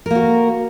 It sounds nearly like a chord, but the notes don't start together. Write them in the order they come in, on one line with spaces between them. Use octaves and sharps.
A#4 A#3 F#4